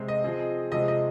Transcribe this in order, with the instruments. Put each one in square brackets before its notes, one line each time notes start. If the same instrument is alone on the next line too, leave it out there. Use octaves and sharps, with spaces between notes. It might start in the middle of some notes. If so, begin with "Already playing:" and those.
Already playing: [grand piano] C3 G#3 C4
[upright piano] D#5
[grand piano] F3 C4 G#4
[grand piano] C3 F3 G#3 C4 G#4 [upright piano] D#5
[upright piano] D#5